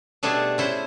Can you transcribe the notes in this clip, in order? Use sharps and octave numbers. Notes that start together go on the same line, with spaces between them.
B2 G3 A3 D4 G#4 A4
C#4 E4 C5